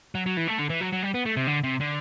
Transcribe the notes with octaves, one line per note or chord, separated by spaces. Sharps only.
F#3
F#3
E3
A3
D3
E3
F#3
F#3
G3
B3
A3
C3
D3
C3
D3